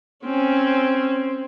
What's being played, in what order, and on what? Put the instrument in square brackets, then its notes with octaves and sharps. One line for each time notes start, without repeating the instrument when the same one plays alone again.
[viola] C4 C#4